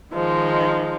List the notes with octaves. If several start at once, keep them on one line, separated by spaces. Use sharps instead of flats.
D#3 F3 G#3 D#4